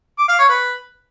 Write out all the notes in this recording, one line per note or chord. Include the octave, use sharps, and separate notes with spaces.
D6
F5
C#5
B4